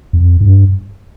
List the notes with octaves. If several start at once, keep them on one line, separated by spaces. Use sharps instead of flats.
F2
G2